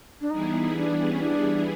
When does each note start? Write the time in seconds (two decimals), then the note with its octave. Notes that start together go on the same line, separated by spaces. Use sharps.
0.21 D4
0.30 E3 G3 B3 D#4 E4 G#4
0.77 D4
1.12 C#4
1.21 D4